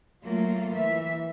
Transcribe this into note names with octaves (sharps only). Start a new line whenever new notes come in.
F#3 A3 A#3 F4
E3 E5